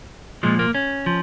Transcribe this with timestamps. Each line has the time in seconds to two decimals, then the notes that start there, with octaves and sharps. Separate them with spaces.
0.43 A#2 F3 G#3
0.59 A#3
0.75 C#4
1.06 F3